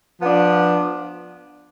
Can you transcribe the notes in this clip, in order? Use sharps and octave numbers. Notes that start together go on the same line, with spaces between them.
F3 B3 D4